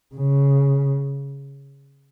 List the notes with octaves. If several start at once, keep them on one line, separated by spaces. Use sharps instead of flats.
C#3